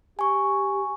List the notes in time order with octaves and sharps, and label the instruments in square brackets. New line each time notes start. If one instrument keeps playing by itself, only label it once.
[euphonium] G4 [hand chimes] G#5 C#6